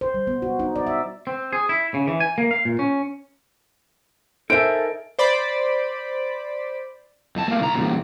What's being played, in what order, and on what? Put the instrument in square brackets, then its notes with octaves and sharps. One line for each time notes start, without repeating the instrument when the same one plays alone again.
[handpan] C5
G3
B3
F#4
D#4
D5
E5
[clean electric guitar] C4
G#4
E4
C#3
E3
G#5
A#3
F5
A#2
C#4
[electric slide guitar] D#4 A#4 G#5 [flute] A4 [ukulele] C5 E5 [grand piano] D7
[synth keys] C5 D5 B5
[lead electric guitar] F2 A5
A3 A#3
C2 A#5
E2 A#2